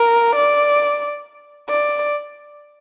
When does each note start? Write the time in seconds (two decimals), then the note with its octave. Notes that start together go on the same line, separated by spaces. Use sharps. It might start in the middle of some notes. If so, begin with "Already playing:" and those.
Already playing: A#4
0.35 D5
1.69 D5